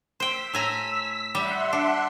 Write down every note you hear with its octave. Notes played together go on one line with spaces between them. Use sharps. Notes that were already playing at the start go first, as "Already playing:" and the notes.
C5 G5 E6 B6
A2 G#5 A#5
G3 E5 F#5 C6
D4